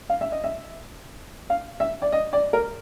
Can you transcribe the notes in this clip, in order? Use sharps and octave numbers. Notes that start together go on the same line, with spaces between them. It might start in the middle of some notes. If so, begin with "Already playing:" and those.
F5
E5
D#5
E5
F5
E5
D5
D#5
D5
A#4